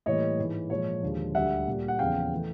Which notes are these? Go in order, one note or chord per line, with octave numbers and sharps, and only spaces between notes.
A2 E3 G3 A#3 C#5 D#5
G#2 E3 G#3
A#2 F3 G#3 C#5
D#2 D3 F3 G#3
D2 D3 G3 E5 F#5
A#2 G3 A#3
F#5
E2 C#3 F3 F5 G5
E3 A3